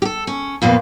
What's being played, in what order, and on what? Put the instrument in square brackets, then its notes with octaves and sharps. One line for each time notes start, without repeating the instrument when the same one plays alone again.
[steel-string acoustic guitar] G4 A4
C#4
F2 A#2 A#3 B3